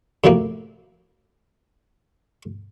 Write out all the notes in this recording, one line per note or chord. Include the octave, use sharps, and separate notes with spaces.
F#2 A2 C3 F3 A#3